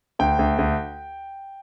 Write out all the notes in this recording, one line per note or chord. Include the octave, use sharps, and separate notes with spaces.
D2 G5
D2
D2